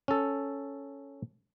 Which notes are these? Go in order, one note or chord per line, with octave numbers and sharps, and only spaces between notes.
C#4 A4